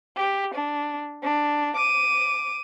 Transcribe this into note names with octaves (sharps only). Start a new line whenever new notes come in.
G4
D4
D4
D6 D#7